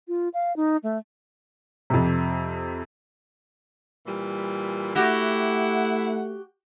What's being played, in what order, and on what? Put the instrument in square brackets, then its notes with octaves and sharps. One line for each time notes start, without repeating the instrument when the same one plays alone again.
[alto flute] F4
F5
D#4
A3
[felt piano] F2 C3
[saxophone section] A#2 E3 G3
[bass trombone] A3 [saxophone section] E4 F#5 [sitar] F#4 G4